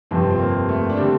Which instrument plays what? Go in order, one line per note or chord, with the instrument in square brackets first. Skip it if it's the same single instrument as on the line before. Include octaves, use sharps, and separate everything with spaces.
[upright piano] G1 F2 C3 F3 [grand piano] C4
[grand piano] C4
A#3
A3
D4
[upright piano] D3 G3 [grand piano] C4